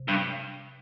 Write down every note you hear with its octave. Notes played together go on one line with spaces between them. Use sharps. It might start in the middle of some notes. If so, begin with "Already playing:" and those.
Already playing: C3
G2